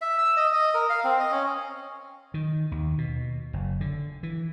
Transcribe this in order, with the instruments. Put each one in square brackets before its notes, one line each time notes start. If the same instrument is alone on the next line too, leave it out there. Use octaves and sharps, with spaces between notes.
[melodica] E5
E6
D#5
D#5
A#4
F5
C4
D#5
C#4
[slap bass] D#3
D#2
B2
F#1
D3
E3